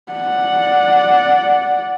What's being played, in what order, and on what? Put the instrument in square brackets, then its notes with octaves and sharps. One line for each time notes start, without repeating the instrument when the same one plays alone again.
[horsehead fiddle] D5 F#5